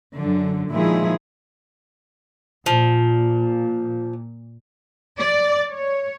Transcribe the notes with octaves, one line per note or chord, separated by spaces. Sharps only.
F#2 D3
A#2 D#3 F3 G#3 E4 G#4
A#2 F3
D5
C#5